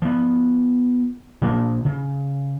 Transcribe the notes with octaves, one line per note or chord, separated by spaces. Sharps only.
F3 B3
A#2 F3 A#3 D4
C#3